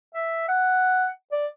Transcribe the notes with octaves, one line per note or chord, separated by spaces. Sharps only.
E5
F#5
D5